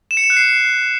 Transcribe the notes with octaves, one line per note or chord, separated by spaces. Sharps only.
E7
C#7
E7
F#6
C7